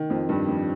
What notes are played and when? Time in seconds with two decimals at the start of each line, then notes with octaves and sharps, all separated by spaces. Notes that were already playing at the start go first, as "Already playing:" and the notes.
Already playing: D#3
0.10 F2 F3
0.29 G2 G3
0.48 F2 F3